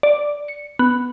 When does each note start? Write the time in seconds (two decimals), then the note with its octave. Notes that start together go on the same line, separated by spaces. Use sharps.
0.03 D5
0.48 C#7
0.79 B3